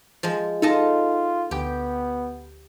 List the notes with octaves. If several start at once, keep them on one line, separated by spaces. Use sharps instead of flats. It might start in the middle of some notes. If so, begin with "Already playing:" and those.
F3 G#3
D#4 F4 A4 D#5 A5
D2 B3 G4 G5